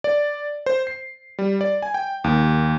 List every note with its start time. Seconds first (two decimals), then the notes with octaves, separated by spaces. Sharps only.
0.04 D5
0.66 C5
0.87 C7
1.39 G3
1.61 D5
1.82 G#5
1.94 G5
2.24 D#2